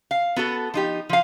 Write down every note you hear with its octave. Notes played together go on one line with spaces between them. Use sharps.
F5
B3 F#4 A4
F3 D#4 G4
F3 F5